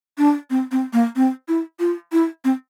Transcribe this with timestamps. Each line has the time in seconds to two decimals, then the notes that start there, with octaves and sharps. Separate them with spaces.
0.18 D4
0.50 C4
0.71 C4
0.93 A#3
1.16 C4
1.48 E4
1.80 F4
2.12 E4
2.44 C4